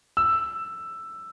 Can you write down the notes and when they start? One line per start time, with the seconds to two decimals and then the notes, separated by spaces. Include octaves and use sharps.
0.17 E6